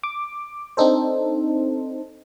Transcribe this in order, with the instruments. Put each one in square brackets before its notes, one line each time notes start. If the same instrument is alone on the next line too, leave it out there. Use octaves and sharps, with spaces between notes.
[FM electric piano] D6
C4 D4 D#4 A4 C5